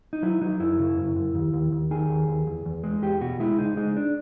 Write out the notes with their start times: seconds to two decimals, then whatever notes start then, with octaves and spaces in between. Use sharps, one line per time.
0.13 D#4
0.23 F#3 E4
0.41 F#3 D#4
0.60 F#2 E4
0.79 C#3
0.97 F#2
1.16 F#2
1.35 D#2
1.53 D#2
1.72 D#2
1.91 D#3 G#4
2.09 D#2
2.28 D#2
2.47 E2
2.66 E2
2.84 G#3
3.02 E2 G4
3.21 B2 F#4
3.40 G#3 E4
3.58 C#2 D#4
3.77 G#3 D#4
3.97 D4